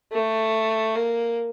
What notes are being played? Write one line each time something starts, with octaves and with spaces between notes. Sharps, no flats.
A3
A#3